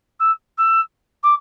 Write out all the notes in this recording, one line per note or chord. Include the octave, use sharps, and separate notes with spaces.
E6
E6
D6